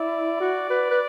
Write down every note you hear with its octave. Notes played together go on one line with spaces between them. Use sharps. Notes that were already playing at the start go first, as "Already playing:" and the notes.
Already playing: E4 D5
F#4
B4
B4